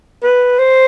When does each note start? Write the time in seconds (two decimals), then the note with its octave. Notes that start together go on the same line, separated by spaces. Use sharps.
0.23 B4
0.59 C5